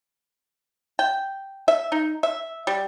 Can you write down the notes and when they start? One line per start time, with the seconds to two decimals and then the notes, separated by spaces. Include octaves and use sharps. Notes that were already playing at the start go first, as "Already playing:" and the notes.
0.99 G5
1.68 E5
1.92 D#4
2.23 E5
2.67 G3